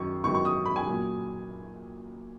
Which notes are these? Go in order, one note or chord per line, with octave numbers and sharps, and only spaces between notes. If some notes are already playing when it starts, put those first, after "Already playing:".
Already playing: F#2 D#3 F#3 C#6
E2 D#3 F#3 C#6
C#6
D#6
B5
G#5
A#2 F#3